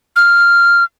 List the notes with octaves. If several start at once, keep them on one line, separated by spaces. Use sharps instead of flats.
F6